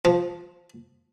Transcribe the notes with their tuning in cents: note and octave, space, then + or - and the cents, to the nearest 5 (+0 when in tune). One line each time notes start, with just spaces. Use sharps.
F3 +5